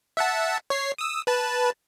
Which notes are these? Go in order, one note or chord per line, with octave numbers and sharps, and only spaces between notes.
E5 F#5 A5
C#5 C7
D#6 E6
B4 A5